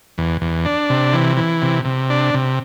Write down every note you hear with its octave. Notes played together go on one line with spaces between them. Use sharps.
E2
E2
D4
C3
E3
E3
C3
C3
D4
C3